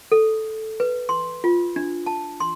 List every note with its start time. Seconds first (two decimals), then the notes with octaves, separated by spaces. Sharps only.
0.12 A4
0.80 B4
1.09 C6
1.44 F4
1.76 D4
2.06 A5
2.40 C6